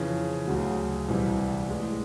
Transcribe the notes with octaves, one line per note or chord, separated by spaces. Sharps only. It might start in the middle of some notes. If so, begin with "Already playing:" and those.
Already playing: F2 C#3 E3
D2 C#3 F#3
C2 C3 E3 G3
A2 E3 G#3